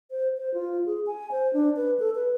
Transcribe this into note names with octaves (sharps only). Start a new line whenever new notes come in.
C5
C5
F4
G#4
G#5
C5
D4
B4
A4
B4